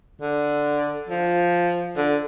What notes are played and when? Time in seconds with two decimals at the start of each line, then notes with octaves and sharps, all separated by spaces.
0.21 D3
1.09 F3
1.96 D3